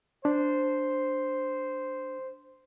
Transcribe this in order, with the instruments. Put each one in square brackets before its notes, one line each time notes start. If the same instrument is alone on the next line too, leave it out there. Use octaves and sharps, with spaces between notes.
[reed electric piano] D4 [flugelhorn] C5